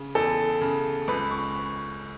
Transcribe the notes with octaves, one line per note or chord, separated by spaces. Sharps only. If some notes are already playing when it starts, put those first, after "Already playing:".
Already playing: C#3
E2 A4
C#3
C#2 B4
C#6